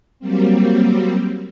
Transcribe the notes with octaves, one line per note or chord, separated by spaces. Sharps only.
F#3 G3 A#3 C4